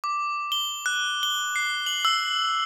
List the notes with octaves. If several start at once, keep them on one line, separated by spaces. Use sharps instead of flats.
D6
G7
F#6
G7
C7
F#7
E6